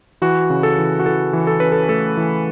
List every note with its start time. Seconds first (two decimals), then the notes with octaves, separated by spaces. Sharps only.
0.22 E3 F#4
0.50 C#3
0.63 A4
0.78 E3
0.99 F#4
1.06 E3 A4
1.33 E3
1.47 A4
1.60 C#4 B4
1.72 A4
1.89 A3 A4
2.17 E3